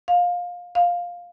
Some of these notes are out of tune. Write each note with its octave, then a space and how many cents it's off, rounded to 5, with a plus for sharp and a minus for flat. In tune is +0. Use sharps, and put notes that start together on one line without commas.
F5 +20
F5 +10